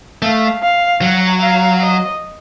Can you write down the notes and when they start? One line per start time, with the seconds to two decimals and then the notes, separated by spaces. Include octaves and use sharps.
0.22 A3 F5
0.62 F5
1.01 F#3 F#5
1.41 F5
1.81 D#5